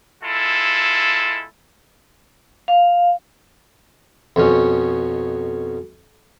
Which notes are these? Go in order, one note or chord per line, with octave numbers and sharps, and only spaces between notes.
G#3 E4 F4 A4
F5
F2 B2 C#4